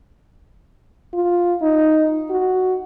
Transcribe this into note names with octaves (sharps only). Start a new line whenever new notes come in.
F4
D#4
F#4